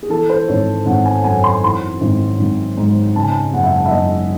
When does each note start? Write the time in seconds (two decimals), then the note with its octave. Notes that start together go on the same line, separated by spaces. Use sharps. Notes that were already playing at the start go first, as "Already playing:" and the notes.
0.03 G#4
0.10 E3 A4
0.29 C5
0.48 G#1 C#5
0.86 G#1 F#5
1.06 G#5
1.19 F#5
1.24 F#2 G#5
1.44 C6
1.63 E3 C6
2.01 G#1
2.39 G#1
2.77 G#2
3.15 C#3 A5
3.23 G#5
3.31 A5
3.53 F#1 F#5
3.64 E5
3.74 F#5
3.86 E5
3.91 F#1 D#5